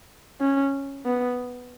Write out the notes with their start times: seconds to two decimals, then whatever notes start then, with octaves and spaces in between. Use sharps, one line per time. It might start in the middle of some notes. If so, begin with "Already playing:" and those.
0.41 C#4
1.06 B3